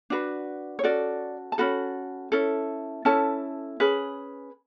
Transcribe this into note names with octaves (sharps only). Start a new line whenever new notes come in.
D4 F#4 B4
C#5
C#4 F#4 A4 D5
A5
C#4 F#4 A4 B5
C#4 E4 A4
C#4 E4 A4 A5
C#4 G#4 B4